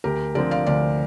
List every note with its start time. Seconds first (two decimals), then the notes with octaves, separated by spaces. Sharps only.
0.04 D2 G4 A#4
0.35 D3 F3 C4 A#4 D5
0.51 D5 F5
0.66 D2 D5 F5